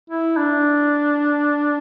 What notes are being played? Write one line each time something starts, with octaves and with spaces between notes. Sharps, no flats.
E4
D4